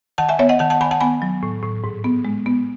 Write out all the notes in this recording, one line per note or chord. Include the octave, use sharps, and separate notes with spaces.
D#3 F#5 A5
E5 G#5
B3 C#5 E5
D#5 F#5
D#3 F#5 A5
F#5 A5
D#3 G#5 B5
F#5 A5
B3 G#5 B5
F#3
A2
A2
G#2
B3
G#3
B3